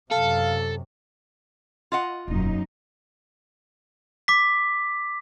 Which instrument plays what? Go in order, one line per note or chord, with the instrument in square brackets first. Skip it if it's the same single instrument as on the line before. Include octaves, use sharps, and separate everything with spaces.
[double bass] F#2 C3 [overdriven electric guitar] A4 [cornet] F5
[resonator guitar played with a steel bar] F4 D#5 F#5
[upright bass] E1 [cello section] F#2 A#3 D#4
[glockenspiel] D6 B6